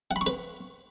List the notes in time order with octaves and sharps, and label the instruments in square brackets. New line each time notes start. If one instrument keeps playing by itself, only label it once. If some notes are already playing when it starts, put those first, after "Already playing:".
[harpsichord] F#5
B5
C#6
B4